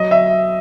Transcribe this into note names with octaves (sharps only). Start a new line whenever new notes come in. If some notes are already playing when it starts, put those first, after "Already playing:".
Already playing: F#3 D#5
E5